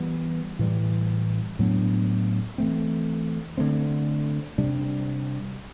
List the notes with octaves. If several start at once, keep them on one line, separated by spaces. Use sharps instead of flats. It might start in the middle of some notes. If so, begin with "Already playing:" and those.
Already playing: E3 G3 B3
A2 E3 G3
A2 F#3 B3 D4
E3 A3 C4
D3 F#3 A3 C4
C3 G3 D4